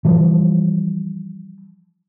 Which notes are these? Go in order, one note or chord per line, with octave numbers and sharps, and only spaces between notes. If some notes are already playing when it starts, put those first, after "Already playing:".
E3 F3 G3